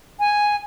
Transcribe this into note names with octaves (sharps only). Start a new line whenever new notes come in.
G#5